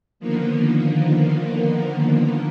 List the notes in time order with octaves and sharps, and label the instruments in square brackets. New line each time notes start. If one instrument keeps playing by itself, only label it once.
[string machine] D3 D#3 F3 A#3 B3